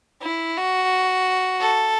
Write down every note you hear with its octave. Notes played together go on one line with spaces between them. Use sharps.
E4
F#4
A4